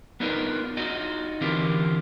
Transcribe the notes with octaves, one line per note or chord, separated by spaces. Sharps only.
B3 D4 D#4 F4 A#4 B4
D#4 F4 F#4 D#5
D3 E3 C4 F4 G4 A#4